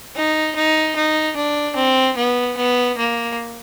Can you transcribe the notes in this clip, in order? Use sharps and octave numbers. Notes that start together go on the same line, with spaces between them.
D#4
D#4
D#4
D4
C4
B3
B3
A#3